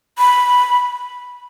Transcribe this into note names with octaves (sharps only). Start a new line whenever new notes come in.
B5